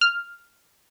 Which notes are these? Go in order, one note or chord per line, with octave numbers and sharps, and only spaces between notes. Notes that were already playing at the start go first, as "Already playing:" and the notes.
F6